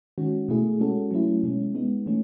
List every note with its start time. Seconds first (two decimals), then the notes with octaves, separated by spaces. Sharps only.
0.18 D#3 G#3 C#4 F#4
0.49 B2 A3 E4 G#4
0.80 G#3 C#4 F#4 A4
1.11 F#3 A3 C#4 E4
1.43 B2 G#3 C#4
1.75 G#3 B3 D#4
2.06 E3 A3 C#4